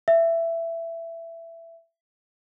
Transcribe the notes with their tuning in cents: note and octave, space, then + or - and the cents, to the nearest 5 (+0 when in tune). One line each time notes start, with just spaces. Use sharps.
E5 +15